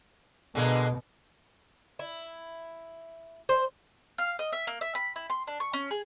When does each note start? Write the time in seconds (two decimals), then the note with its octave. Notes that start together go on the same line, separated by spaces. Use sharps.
0.55 B2 D3 G#3 A#3
1.99 E4
3.49 C5
4.18 F5
4.39 D#5
4.53 E5
4.67 A#3
4.81 E5
4.95 B5
5.16 E4
5.30 C6
5.47 D4
5.60 C#6
5.73 C#4
5.91 G#4